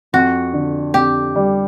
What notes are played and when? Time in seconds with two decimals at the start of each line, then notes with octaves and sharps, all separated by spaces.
0.13 F2 F#4
0.53 D3
0.94 F2 G4
1.36 G3